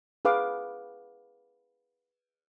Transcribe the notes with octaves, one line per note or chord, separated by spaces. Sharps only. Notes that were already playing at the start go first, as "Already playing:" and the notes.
G#4 B4 F5 D6